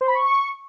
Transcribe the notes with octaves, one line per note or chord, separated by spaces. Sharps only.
C5
B5
C#6